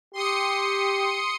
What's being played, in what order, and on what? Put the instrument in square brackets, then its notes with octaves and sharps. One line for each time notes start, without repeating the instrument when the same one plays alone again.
[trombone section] G4 [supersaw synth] C6 D#6 C#7